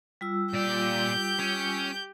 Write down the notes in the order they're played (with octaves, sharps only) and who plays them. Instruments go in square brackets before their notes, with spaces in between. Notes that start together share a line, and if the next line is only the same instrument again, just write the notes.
[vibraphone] G3 F4 E6
[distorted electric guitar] A#2 D5 [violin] G4 G6
[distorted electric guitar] C#4